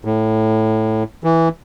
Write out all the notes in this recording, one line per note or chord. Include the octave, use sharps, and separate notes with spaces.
A2
E3